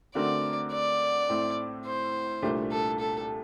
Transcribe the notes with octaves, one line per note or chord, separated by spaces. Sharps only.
D3 A3 C4 F#4 A#4 D5
D5
A2 A3 C4
C5
C2 A#2 A3 D4 G4
A4
A4